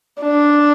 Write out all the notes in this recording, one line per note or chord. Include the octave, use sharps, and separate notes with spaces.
D4